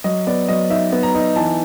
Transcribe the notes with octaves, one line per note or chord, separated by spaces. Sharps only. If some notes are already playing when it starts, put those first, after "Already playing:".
F#3 D#5
B3 D5
F#3 D#5
D#4 E5
B3
A#5
D#4
E3 A5